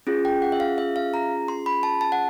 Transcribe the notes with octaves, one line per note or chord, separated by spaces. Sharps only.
C#4 F4 G#4
G5
F#5
E5
F5
E5
F5
A#5
C6
B5
A5
A5
F#5